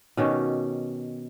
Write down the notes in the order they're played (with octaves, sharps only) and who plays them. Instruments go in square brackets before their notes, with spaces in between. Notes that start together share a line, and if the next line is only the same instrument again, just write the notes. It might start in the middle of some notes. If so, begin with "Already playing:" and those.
[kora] B2 D#3 C#4 G4